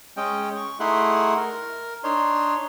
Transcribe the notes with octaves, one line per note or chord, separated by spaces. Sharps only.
G#3 C#4 D#5 G5
C#6
A3 D#4 E4 G#4 F#5 C6
A#4
D4 D#4 C#5 C6